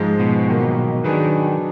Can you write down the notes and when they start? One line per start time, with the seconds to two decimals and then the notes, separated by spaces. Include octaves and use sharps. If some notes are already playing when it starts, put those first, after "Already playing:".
Already playing: G#2 F3 G#3
0.20 B2
0.48 D#3 F#3 A#3
1.04 D#3 F#3 D4 G#4 B4